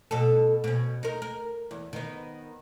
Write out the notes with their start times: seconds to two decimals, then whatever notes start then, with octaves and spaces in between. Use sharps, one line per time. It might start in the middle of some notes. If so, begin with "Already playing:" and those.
0.11 B2 A4
0.64 B2 C#4
1.03 D#4 A#4
1.22 A#4
1.71 E2
1.93 D#3 B3